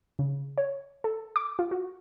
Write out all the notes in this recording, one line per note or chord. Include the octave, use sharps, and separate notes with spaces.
C#3
C#5
A4
D6
F4
F#4